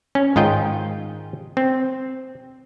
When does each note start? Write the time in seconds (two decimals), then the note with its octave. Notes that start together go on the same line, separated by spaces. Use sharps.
0.15 C#4
0.36 G#2 D#3 F4 D#5 G5
1.57 C4